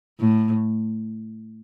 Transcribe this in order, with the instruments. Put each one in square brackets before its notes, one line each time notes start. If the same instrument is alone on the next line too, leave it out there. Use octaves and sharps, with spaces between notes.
[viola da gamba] A2